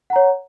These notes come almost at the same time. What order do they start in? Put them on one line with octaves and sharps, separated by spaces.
F#5 A#5 C#5